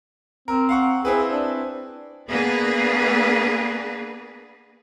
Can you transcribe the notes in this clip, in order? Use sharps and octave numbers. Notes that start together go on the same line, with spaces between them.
C4 A#4
F5 F#5 C#6
C4 E4 G#4 B4
D4
A#3 B3 D4 G#4 B4